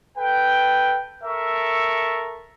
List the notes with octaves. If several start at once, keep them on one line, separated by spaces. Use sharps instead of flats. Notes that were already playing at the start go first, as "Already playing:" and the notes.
A4 B4 G5
A4 A#4 E5 C#6